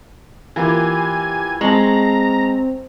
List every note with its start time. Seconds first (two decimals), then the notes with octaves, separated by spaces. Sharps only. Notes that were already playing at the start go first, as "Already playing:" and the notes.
0.56 E3 A#3 F4 G4 G#5
1.61 G#3 C4 A5 A#5 C#6